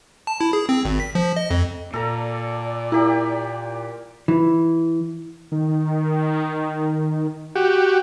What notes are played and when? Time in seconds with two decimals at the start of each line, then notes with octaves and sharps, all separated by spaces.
0.27 A5
0.41 E4
0.53 G#4
0.69 C4
0.85 G#1
1.00 B6
1.15 F3
1.36 D#5
1.50 F2
1.94 A#2 A4 D5 A#5
2.92 A#3 E4 G4
4.28 E3
5.52 D#3
7.55 F#4 G4